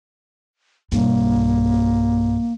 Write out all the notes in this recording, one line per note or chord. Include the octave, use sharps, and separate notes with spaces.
B1 G2 A#3